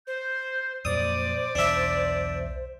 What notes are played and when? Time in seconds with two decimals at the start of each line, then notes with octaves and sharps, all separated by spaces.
0.07 C5 G6
0.85 F2 A#2 F#3 C5 D5 D#6
1.55 B1 E2 D4 E5